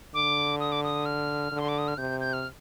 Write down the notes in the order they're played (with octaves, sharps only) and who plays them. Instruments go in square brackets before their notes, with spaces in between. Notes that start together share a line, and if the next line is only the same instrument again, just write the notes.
[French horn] D3 [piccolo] D6
[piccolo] D#6
D6
D#6
F6
[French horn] D3
[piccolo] C6
D6
D#6
F6
[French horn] C3 [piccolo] G6
[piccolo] G6
F6